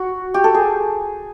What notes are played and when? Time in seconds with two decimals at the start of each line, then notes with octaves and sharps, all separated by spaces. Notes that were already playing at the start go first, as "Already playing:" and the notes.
Already playing: F#4
0.34 G4
0.44 A4
0.54 G#4